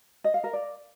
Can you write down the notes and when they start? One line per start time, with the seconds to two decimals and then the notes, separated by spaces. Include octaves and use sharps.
0.24 D#5
0.34 F5
0.44 A#4
0.53 D5